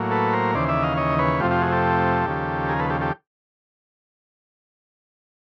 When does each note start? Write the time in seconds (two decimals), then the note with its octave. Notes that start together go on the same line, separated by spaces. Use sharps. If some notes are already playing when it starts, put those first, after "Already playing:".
Already playing: A2 F#3 A#3
0.11 A4 B4
0.33 A#4 C5
0.54 D#2 C#3 E3 C5 D5
0.68 D5 E5
0.83 D#5 F5
0.97 C#5 D#5
1.19 B4 C#5
1.40 F2 C3 F3 A3 F4 G4
1.51 F4 G4
1.62 F#4 G#4
1.72 G4 A4
2.26 D#2 C#3 F3
2.69 G#4 A#4
2.79 A4 B4
2.90 G4 A4
3.01 G4 A4